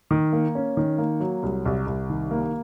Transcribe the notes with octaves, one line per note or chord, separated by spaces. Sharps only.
D#3
A#3
C#4
D#3
A#3
F#3
C2
C2
C2
D#3
A#3